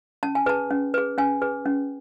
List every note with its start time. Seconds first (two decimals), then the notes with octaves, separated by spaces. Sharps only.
0.23 C#4 A5
0.35 G#5
0.46 G#4 B4 A5
0.71 C#4
0.94 G#4 B4
1.18 C#4 G#5
1.42 G#4 B4
1.66 C#4